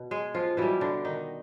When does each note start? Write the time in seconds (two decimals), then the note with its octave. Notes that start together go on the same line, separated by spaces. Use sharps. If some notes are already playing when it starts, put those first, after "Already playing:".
Already playing: B2
0.11 G#3 G#4
0.34 F3 F4
0.57 B2 E3 G3 E4
0.81 D3 D4
1.05 D#3 D#4